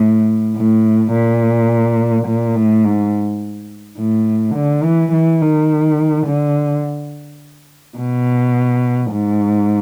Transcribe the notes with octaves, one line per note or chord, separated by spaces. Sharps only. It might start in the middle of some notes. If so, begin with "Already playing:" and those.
Already playing: A2
A2
A#2
A#2
A2
G#2
A2
D3
E3
E3
D#3
D3
B2
G#2